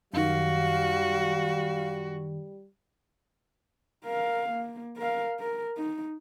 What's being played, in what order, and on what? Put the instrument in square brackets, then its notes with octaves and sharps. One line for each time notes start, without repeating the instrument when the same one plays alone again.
[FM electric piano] F#2 D#3 [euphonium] G3 [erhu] F#4 [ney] F5
[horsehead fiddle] A#4 F5
A#3
A#4 F5
A#4
D#4